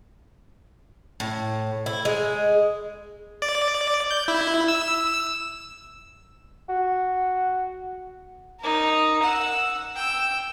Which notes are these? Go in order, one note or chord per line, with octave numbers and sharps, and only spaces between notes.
A2
E4
G#3
D5
G6
E4
E6
F#4
D#4 A#4
F#5 E6
G5 E6